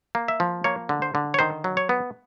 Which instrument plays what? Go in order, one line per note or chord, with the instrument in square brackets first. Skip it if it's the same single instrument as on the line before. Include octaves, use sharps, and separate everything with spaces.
[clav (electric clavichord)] A#3
E5
F3
A#3 C#5
D3
C5
D3
C#5
D#3 C5
F#3
C#5
B3